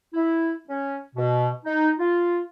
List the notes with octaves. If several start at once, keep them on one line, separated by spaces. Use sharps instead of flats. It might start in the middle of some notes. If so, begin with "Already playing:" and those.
E4
C#4
B2
D#4
F4